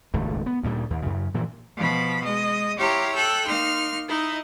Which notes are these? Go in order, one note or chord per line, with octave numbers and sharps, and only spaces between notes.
D#1 G#1 C#2 A3
B3
D2 A#2 G3
D#2
F#2 C#3
A#2 E3 F3
B2 F3 B5
G#3 D#5
E4 G4 C#5 F5 A#5 C6
A4 G5 E6 F#6
A#3 D#4 C6 F6
D#4 E4 D#5